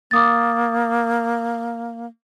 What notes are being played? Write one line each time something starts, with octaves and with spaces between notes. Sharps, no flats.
A#3 D6 D#6 A6